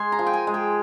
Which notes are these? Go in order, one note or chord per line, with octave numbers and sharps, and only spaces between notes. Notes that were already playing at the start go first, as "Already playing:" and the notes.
Already playing: G#3 G#5 C6
A#5
F3
G5
G#5
G#3
G5